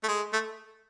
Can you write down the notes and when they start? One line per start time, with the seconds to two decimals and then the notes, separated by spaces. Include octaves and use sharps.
0.03 A3
0.08 G#3
0.33 A3